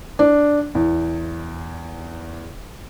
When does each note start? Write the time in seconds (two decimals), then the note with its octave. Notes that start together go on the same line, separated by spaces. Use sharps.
0.19 D4
0.75 E2